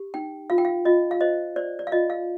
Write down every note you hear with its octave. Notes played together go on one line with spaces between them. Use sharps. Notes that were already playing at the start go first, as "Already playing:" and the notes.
Already playing: G4
D#4 G5
F4 F5
G5
F5
F4 D#5
F5
C5 D#5
C5 D5
D5
F5
F4 D#5
F5